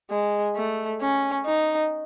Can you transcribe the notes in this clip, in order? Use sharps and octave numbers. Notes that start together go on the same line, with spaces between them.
G#3
A3
C#4
D#4